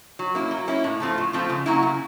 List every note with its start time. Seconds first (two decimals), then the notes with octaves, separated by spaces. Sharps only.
0.19 F#3
0.35 A#3 C#4 E4
0.51 F#3
0.68 A#3 C#4 E4
0.84 A2
1.00 F3 A3 C4 F4
1.18 A2
1.33 F3 A3 C4 F4
1.49 C#3
1.66 F#3 A#3 C#4 E4
1.83 C#3